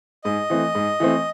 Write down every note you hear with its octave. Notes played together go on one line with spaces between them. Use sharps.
G#2 D#5
E3 A3 C4
G#2
E3 A3 C4